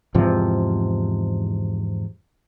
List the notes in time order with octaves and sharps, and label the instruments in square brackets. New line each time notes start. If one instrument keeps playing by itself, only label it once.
[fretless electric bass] E2 G#2 C3 F3